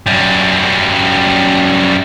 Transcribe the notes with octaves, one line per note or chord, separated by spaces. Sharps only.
F#2 G3